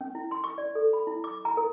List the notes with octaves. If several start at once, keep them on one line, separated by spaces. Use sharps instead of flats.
C#4
E4
C6
C#6
D5
A4
B5
E4
D6
A#5
A#4